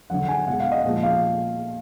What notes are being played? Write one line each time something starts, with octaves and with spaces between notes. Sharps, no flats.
D3 F#3 F#5
G#5
B2 G#3 F#5
F5
D#5
A#2 F3 G#3
F5